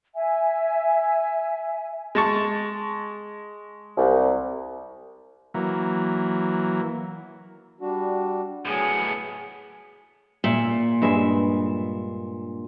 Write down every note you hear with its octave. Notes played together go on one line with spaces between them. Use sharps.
E5 G#5
G#3 A5 C#6
C2
E3 F#3 A#3
G3 D4 F#4
A2 F#3 B3 G#4
A#2 E5
G2 G#3 E5